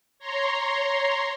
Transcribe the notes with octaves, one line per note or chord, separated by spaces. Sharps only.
C#5 A#5 C6